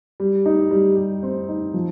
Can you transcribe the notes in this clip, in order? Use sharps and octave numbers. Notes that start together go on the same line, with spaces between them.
G3
D#4
G3
G3
C4
D#4
F3